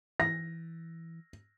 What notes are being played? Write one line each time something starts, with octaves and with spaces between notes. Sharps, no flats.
E3 A#6